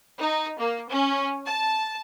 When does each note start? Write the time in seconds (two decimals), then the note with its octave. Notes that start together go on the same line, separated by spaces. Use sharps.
0.18 D#4
0.58 A#3
0.89 C#4
1.45 A5